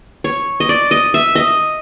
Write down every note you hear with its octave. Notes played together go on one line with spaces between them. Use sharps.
C#5
D#5
D5
D#5
E5
D#5